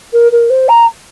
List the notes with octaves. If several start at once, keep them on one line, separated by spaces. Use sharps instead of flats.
A#4
A#4
C5
A#5